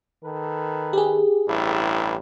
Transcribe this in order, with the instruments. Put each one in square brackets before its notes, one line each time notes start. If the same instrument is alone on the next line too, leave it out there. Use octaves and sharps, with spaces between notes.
[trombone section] D#3 A4 B4
[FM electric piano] G4 G#4
[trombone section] A1 G2 E4